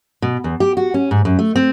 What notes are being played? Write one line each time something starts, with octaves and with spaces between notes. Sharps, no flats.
B2
E2
G4
F#4
C#4
G#2
F#2
A3
C4